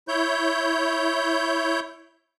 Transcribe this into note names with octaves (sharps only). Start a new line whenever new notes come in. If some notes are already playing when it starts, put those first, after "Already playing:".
E4 C#5 G6